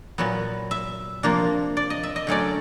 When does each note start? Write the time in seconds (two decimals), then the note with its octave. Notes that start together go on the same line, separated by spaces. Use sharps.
0.18 A#2 F#3 B3
0.71 E5
1.23 C3 F3 A#3 D4
1.77 D5
1.90 D#5
2.03 E5
2.16 D#5
2.27 D3 F#3 A3 C#4 D5